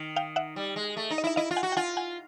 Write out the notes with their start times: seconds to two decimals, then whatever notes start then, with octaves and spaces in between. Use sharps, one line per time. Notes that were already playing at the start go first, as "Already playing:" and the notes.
Already playing: D#3
0.16 F5 G5
0.36 E5 F#5
0.56 G3
0.76 G#3
0.97 A3
1.10 D#4
1.18 D#5
1.24 E4 E5
1.36 E4 D#5 F5
1.51 F4
1.56 F#5 G#5
1.63 F#4
1.72 G5
1.77 F4 F#5 G#5
1.97 F#5 G#5